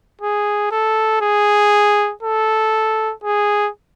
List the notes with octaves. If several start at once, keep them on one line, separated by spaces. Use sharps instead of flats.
G#4
A4
G#4
A4
G#4